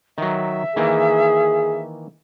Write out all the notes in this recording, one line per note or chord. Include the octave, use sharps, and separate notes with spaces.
D#3 F#3 E5
D#3 E3 A#3 G#4